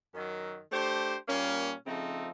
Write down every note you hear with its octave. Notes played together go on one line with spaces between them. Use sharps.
F#2 D#3 F#3
A3 D4 G4 C5
A#2 G3 A#3 C#4
C#3 F3 A3 C4 D#4